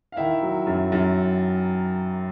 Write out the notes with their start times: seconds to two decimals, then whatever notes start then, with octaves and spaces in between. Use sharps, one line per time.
0.12 F5
0.17 D#3 E4 E5
0.42 F#3
0.67 F#2
0.92 F#2